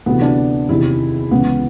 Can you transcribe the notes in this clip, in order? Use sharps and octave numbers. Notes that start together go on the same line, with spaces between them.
D2 C3 E3 B3
D4
E2 C3 D#3 E4
C#2 C#3 E3 B3